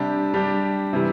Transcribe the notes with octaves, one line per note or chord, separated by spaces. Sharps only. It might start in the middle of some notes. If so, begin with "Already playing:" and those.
Already playing: C3 G3 D4 G4
G3 D4 G4
C3 E3 G3